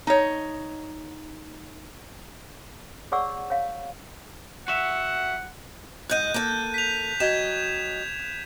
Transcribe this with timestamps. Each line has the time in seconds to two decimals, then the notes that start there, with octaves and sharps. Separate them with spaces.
0.07 D#4 C#5
3.12 G#4 C#5 D5 F#5 C#6 E6
3.50 C#5 F5
4.68 F#4 E5 F#5
6.10 G#2 D#5 F#5 F#6 G6 D#7
6.34 A#3 A4
6.74 B6 F7
7.20 F#3 D#5 G5 G#6 E7